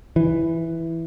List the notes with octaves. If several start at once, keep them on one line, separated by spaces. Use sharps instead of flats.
E3